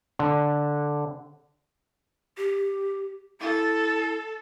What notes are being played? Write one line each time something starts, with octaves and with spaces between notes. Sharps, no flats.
D3
G4
E4 A4